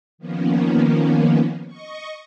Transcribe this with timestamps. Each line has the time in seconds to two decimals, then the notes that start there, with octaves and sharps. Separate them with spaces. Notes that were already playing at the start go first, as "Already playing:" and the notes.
0.18 D#3 F3 A#3 B3 C#4
1.67 D#5 C#6